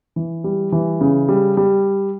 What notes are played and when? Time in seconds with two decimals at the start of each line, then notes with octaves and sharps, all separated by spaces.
0.16 E3
0.44 G3
0.72 E3
1.01 C#3
1.28 G3
1.57 G3